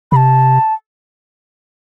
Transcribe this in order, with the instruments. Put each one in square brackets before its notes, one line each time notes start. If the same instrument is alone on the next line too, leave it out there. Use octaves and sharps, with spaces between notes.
[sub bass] C3 [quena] A5 B5